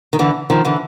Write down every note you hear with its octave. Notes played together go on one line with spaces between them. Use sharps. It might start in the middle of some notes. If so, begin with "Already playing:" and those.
D#3
D3 E3
D#3 F3
D3 E3